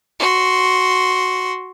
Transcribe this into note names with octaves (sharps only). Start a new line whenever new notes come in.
F#4 C6